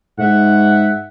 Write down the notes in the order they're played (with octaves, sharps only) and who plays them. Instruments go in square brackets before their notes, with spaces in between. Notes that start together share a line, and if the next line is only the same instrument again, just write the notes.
[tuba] G#2 [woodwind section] E5 F#5